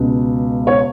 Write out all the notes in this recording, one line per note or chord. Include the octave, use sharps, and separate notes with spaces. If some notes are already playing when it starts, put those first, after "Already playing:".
Already playing: C#2 B2
C#5